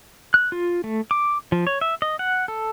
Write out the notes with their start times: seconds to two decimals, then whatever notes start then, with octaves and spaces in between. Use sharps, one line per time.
0.34 F#6
0.52 F4
0.84 A3
1.11 D6
1.52 F3
1.67 C#5
1.81 E5
2.02 D#5
2.19 F#5
2.48 A4